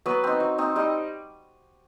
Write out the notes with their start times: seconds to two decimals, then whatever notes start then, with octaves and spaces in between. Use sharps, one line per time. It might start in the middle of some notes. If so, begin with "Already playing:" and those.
0.06 F#3 B3 B4
0.24 C4 D#4
0.40 F#3
0.58 C4 D#4
0.75 G3 D#4 D#5